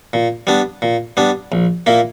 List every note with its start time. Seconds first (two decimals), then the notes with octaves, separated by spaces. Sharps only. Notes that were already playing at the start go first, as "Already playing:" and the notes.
0.13 A#2
0.47 G3 B3 D4
0.82 A#2
1.17 G3 B3 D4
1.52 A#1
1.86 A#2 A#3 E4